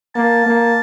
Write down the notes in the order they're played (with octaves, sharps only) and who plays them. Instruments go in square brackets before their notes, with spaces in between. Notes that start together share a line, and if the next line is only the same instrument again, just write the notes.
[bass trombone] A#3 [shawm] A5
[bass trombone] A#3